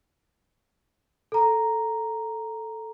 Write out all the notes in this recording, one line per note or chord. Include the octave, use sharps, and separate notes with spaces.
A4 A#5